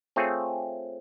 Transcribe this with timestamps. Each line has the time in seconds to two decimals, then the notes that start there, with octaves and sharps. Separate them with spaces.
0.16 A3 C4 F4 G#4 C#5